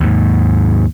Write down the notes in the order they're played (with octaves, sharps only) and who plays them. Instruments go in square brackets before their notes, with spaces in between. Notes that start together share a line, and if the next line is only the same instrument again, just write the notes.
[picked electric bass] D#2 G#2